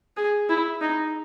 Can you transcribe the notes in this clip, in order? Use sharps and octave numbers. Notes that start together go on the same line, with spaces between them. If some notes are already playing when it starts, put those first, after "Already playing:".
G#4
E4
D#4